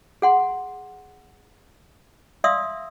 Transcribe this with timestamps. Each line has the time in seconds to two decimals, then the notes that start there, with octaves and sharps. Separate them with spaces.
0.22 G#4 F#5 C6
2.44 D5 E5 F5 C6 D#6 E6